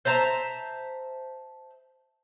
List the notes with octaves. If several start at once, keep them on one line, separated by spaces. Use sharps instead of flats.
C5 E5 A5 A#5